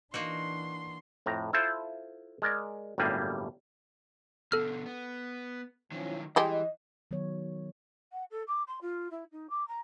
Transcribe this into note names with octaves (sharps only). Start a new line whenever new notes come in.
E3 A#3 D4 D#4 F#4 C6
F2 A2 A#5
E4 F4 A4 C5 E5
G#3 A#4 D5
G1 F#2 A2 G3 A#3 G#4
B2 D3 A4 F6
B3
D#3 F3 F#3 C#4 E4
E3 G3 G#3 G4 D#5
D#3 F#3 B3 C#5
F#5
A4
D6
C6
F4
E4
D#4
D6
A#5